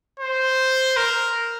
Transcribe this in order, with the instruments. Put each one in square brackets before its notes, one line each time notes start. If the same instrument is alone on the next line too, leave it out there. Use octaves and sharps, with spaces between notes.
[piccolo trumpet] C5
A#4